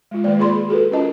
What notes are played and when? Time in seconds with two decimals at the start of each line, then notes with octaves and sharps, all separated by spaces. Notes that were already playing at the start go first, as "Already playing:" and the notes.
0.11 G#3 F4
0.24 D#3 G#3 A#3 D5
0.39 F4 G#4 D5 B5 C6
0.55 G#4
0.69 F#4 G#4 A4 B4
0.91 C#4 F4 A#4 D#5 A5